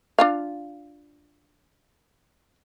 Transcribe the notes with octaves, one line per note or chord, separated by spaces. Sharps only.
D4 F4 F5